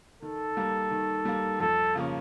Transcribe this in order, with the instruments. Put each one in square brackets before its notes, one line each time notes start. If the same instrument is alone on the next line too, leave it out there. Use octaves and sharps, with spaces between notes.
[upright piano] D#3 [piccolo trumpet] A4
[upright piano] G3 A#3
D#3
G3 A#3
[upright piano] F2 [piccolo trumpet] A4
[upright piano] C#3 F3 A#3 C#4